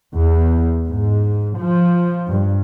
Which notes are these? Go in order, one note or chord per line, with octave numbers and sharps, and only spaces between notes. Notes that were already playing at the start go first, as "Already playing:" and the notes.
E2
G#2
F3
G2